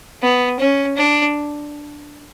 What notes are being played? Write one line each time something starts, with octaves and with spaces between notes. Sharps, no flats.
B3
C#4
D4